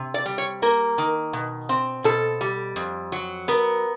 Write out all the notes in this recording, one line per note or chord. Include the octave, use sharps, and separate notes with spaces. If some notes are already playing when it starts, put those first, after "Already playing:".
Already playing: C3
D5
G3
C#5
A#3 A#4
D#3
B2
C4
B2 A4
G3
F2
F#3
B3 A#4